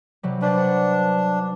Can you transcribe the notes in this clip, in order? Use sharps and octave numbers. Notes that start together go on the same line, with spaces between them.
C3 F#3 G3
D4 B4 C5 D5
F#5